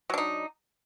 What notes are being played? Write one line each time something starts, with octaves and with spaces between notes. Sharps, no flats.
F#3 D4 D#4